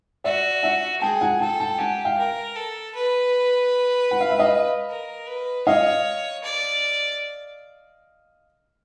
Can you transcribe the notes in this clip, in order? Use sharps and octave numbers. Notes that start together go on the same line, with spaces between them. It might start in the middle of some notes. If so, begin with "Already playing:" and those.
F#4 D5 E5
E5 F#5
G#4 G5 A5
F#5 G#5
A4 G5 A5
G5 A5
G4 F#5 G#5
F5 G5
A#4
A4
B4
F#5
F5
E5
D#5 F5
A#4
B4
C#5 D#5 F5
D5